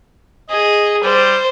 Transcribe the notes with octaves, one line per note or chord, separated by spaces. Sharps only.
G#4 D#5
G3 C5